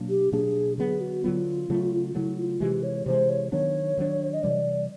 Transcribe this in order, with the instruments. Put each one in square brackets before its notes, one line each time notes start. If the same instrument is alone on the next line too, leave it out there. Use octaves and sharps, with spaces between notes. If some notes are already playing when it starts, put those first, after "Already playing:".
Already playing: [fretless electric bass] B2 F#3 A#3 D4
[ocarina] G4
[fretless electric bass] B2 F#3 A#3 D4 [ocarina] G#4
[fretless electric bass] D3 F#3 B3 [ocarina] G#4
[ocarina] F#4
[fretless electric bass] D3 F#3 B3 [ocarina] F4
[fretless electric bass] C#3 F#3 A3
[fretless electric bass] C#3 F#3 A3 [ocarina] E4
[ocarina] F4
[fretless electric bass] C3 E3 G#3 [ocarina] G4
[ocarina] C#5
[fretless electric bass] C3 E3 G#3 [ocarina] C5
[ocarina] C#5
[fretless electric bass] D#3 F#3 B3 D4 [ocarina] C#5
[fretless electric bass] D#3 F#3 B3 D4
[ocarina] D#5
[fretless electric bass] C3 E3 G3 [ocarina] D5